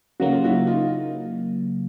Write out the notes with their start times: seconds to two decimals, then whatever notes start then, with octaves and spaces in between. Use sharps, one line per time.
0.20 C#3 F#3 A#3 F#4
0.32 F4
0.44 E4 F#4
0.66 D#4 F4